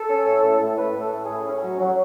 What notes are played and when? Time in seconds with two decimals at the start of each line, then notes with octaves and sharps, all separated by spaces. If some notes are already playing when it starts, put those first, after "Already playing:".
Already playing: A4
0.09 C#4
0.25 A2
0.43 A2
0.60 A2
0.77 A2 B4
0.94 A2
1.00 A4
1.11 C#4
1.23 G#4
1.28 A2
1.45 C#4
1.63 F#3
1.80 F#3